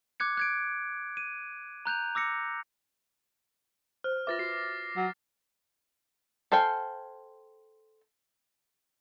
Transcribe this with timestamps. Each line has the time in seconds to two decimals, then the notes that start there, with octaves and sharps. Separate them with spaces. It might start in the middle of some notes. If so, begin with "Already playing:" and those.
0.20 D6 F#6 G#6 C#7
0.37 F#6 G#6 D7
1.17 D#7
1.85 A#5 F#6 G6 F7
2.15 D6 E6 A#6 C#7
4.04 C5 F6
4.27 F4 B4 E5 D6 A6 A#6
4.39 F#4 C7
4.97 F#3
6.52 A4 C5 F5 G5 G#5